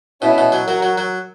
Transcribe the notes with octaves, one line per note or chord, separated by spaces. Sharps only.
B2 C#4 E4
B2
F#3
F#3 F#4 A#4
F#3
F#3